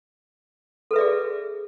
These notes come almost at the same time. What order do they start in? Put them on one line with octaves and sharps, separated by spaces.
A4 B4 E5 D5 G#4